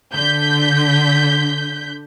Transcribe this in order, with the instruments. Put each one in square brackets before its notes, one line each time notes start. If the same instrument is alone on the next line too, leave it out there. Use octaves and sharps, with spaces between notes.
[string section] D3 G6 B6